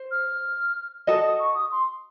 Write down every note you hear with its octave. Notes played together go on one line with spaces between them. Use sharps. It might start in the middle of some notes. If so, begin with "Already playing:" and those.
Already playing: C5
F6
F#4 A4 D#5 A5 D#6
D#6
C#6
D#6
C6